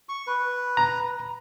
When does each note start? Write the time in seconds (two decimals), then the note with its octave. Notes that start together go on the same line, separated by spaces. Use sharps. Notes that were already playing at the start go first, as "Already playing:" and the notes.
0.09 C#6
0.27 B4
0.77 A#5